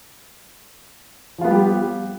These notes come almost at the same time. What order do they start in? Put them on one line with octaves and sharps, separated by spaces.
F3 F4 B3 G3 G4